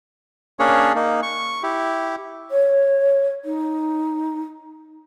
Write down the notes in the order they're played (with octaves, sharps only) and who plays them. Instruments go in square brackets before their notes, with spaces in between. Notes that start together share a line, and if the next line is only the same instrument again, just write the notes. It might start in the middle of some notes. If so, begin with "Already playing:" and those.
[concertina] A#3 C#4 D4 G#4 C#5
A#3 D#4
C#6
E4 G4
[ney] C#5
D#4